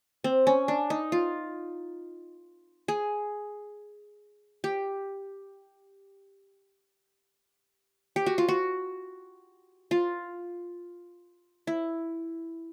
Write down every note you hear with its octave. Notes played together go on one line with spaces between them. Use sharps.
C4
C#4
D4
D#4
F4
G#4
G4
G4
F#4
F4
F#4
F4
E4